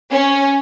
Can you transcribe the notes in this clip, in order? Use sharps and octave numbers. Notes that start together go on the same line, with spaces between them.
C#4